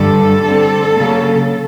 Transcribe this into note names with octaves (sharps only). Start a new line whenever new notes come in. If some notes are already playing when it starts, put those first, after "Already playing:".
Already playing: G2 D3 G3 A4
D3 G3 C4
C#3 F#3 A#3